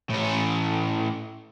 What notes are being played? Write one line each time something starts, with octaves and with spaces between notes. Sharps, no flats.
A2 C#4